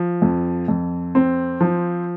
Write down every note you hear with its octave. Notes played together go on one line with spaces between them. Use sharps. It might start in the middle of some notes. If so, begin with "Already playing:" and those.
Already playing: F3
F2
F2
C4
F3